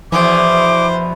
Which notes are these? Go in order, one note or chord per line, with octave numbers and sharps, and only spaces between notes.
E2 B2 E3 F3 C5 D6